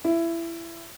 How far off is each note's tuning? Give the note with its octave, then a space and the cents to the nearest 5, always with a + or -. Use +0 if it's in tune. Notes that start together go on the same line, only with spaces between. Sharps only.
E4 +20